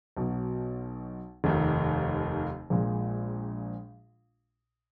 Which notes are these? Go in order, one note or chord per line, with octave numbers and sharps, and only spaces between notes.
B1 B2 F#3
F1 D#2 D#3
A#1 A#2 G#3